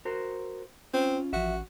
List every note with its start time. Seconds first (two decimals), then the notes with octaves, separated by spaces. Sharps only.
0.05 F#4 A#4 C5
0.94 C4 C#4 F4
1.33 A1 F3 F#4 E5